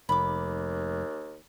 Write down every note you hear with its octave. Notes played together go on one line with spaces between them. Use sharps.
F1 D#2 B5 D6